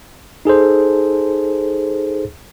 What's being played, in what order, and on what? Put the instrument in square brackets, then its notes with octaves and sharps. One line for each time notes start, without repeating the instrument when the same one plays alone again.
[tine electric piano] D#4 G#4 A4 C5